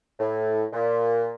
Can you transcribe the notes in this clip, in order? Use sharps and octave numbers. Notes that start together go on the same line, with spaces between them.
A2
A#2